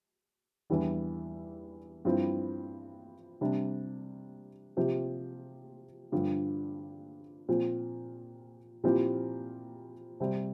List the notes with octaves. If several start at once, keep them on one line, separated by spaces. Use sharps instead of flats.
E2 E3 G3 D4
G2 F3 C4 E4
C3 G3 D4
C3 F3 C4 G4
G2 D3 F3
A#2 F3 C4
A#2 F3 C4 E4 G4
C3 G3 C4